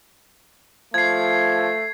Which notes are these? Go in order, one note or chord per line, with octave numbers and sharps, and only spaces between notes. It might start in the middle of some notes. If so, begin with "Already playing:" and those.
F3 A3 G#6 C7